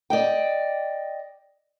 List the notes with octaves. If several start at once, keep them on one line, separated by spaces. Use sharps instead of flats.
D5 D#5 G5